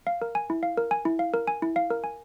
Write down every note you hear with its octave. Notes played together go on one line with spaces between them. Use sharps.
F5
A#4
G#5
E4
F5
A#4
G#5
E4
F5
A#4
G#5
E4
F5
A#4
G#5